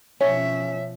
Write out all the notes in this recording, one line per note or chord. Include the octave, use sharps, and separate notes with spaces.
B2 F3 C#4 C#5 E5